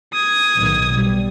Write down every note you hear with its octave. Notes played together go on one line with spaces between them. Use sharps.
D#6 G#6
B1 A2 D#3
B2 G3